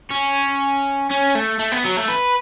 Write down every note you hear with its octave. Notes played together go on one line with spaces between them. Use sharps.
C#4
C#4
A3
A3
B3
F#3
A3
B4